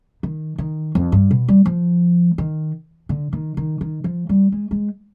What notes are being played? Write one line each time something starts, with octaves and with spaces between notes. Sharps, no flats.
D#3
D#3
F2
G2
B2
G3
F3
D#3
D3
D#3
D#3
D#3
F3
G3
G#3
G#3